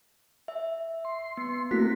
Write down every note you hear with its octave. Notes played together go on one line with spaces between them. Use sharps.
E5
C6
B3
A3 A#3 C4 E4 F#4 B6